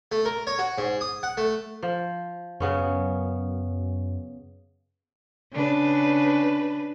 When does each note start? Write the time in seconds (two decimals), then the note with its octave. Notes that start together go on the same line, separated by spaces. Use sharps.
0.12 A3
0.25 A#4
0.47 C#5
0.59 F#4
0.78 G#2
1.01 D#6
1.23 F#5
1.37 A3
1.83 F3
2.60 F#2 C#3 B3 C#4
5.52 C#3 D4 B4